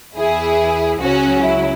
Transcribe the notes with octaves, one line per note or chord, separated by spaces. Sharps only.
E2 E3 E4 G#4
C#2 C#3 F#3 C#4 F#4
E4